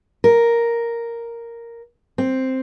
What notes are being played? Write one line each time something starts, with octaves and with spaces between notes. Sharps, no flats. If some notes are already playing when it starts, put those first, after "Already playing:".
A#4
C4